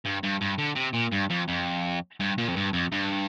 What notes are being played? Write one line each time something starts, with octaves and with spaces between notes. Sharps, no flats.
G2
G2
G2
D3
C3
A#2
G2
F2
F2
G2
A#2
F2
G2
F2
G2